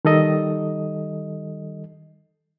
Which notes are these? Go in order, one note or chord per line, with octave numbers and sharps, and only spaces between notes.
D#3 G3 A4 D#5